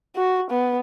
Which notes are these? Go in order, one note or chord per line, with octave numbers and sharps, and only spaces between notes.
F#4
B3